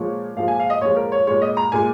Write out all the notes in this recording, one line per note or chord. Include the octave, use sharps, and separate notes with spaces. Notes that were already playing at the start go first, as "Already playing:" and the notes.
Already playing: A#2 F3 G#3 C#5
A#2 F3 G#3 F5
G#5
F5
D#5
A#2 F3 G#3 C#5
A#4
C#5
A#2 G#3 C#5
D#5
A#5
A#2 G#3 G#5